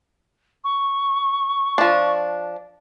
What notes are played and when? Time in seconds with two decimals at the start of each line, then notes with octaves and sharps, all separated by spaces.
0.64 C#6
1.78 F3 D4